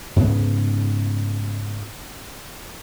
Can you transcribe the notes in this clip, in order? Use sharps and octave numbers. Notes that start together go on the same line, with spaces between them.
G#2 C#3 B3